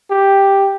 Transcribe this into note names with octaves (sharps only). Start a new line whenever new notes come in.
G4